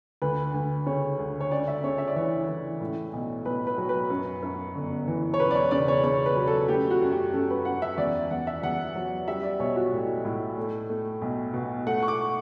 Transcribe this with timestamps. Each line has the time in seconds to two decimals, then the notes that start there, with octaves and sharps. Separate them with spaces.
0.22 D2 B4
0.54 D2
0.86 C#3 C#5
1.19 D2
1.41 C#5
1.51 C#2 D5
1.68 E5
1.84 C#3 C#5
1.98 E5
2.08 D5
2.16 E3 C#5
2.49 E3
2.81 A2
3.13 B1
3.45 B1 B4
3.67 B4
3.78 F#3
3.89 B4
4.10 F#2
4.42 F#2
4.75 G1
5.07 E3
5.34 C#5
5.40 E1 B4
5.51 D5
5.55 C#5
5.71 C#3 D5
5.88 C#5
6.04 C#3 C#5
6.26 B4
6.36 F#3
6.47 A4
6.68 A3 G4
6.91 F#4
7.01 F#2
7.12 G4
7.33 F#2 A4
7.50 B4
7.65 F#2 F#5
7.82 E5
7.98 E2 D5
8.31 E2 F#5
8.47 E5
8.63 E2 F#5
8.96 F#3
9.28 G3 E5
9.43 D5
9.59 B1 C#5
9.76 F#4
9.93 A2
10.25 A2
10.58 A3
10.90 A3
11.22 B1
11.53 B2
11.87 A3 F#5
12.03 C#6
12.08 D6